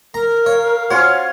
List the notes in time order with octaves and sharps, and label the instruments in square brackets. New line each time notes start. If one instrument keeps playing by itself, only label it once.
[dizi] A#4 [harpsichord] A#5
[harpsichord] C#5 [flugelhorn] F5
[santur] C#4 F4 C#5 [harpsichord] F#4 C5